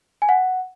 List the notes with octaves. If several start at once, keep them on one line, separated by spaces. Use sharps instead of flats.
G#5
F#5